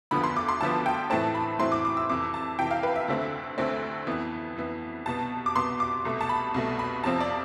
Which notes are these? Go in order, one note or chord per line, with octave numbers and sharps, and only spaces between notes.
D2 D3 F3 B3 B5
C6
D6
C6
D2 D3 F3 B3 A5
G5
A2 E3 A3 C4 A5
B5
A2 E3 A3 C4 C6
D6
D6
E6
F2 C3 E3 D6
A5
F2 C3 E3 G5
F5
B4
E5
D2 D3 A3 C4
D2 D3 A3 C4
F2 E3 B3
F2 E3 B3
C2 B2 B3 A5
D6
C2 B2 B3 C6
D6
C2 B2 A3
A5
B5
C2 B2 A3
B5
F2 C3 F3 C4 A5
D5